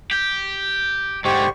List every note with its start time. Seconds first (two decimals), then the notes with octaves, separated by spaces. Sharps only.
0.11 G4
1.25 G#2 D3 G4 C5 C#6